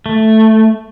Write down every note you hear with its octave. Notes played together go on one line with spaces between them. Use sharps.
A3